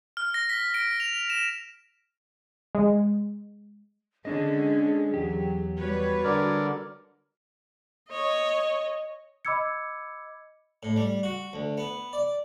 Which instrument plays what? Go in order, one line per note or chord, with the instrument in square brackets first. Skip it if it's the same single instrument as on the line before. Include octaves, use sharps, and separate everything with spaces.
[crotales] F6
A#6
B6
D7
F7
E7
[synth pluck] G#3
[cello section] D3 G#3 C#4 [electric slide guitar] D4 D#5 [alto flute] G#4
[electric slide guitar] E2 G4 [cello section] F#3
[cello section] G3 B4 C#5 [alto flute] F#4
[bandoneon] D3 A#4 D5
[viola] C#5 D#5
[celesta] D#5 B5 D6 E6 G#6 C#7
[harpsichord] A2
G3
F#4
D2
B3
D5